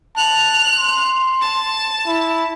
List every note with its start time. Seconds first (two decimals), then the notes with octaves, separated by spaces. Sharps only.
0.17 A5 F#6 F7
0.78 C6
1.41 A5
2.07 E4